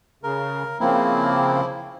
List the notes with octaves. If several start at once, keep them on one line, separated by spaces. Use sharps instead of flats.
C#3 A#4
C#3 F3 A#3 C4 E4